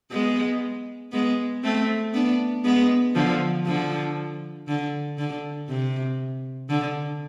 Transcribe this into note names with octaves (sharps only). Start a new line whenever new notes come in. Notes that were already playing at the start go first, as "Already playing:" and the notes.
G#3 B3
G#3 B3
A3 C4
B3 D4
G#3 B3
D3 F3
D3 F3
D3
D3
C3
D3